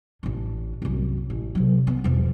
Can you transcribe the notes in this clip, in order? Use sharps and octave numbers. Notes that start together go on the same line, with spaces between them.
A1 D3
C2 F#2
A1
C3 F#3
B3
E1 F3